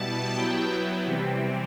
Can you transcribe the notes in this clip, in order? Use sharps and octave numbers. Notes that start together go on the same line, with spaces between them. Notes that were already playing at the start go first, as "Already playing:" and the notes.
Already playing: B2 G3 B3 E4 A5
F#3 B3 E4 G5
C3 E3 G3 C4